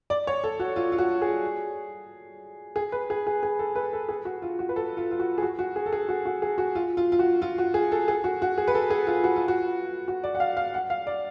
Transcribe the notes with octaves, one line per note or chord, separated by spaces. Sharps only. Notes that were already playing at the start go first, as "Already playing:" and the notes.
D5
C#5
A4
F#4
F4
F4
F#4
G#4
G#4
B4
G#4
G#4
G#4
A4
B4
A4
G#4
F#4
F4
F#4
B4
A4
F4
F4
F#4
G#4
F#4
F#4
G#4
A4
G#4
F#4
F#4
G#4
F#4
F4
F4
F4
F#4
F4
F#4
G#4
A4
G#4
F#4
F#4
G#4
B4
A4
G#4
F4
F#4
F4
F#4
F#4
D5
F#5
F5
F5
F#5
F5
D5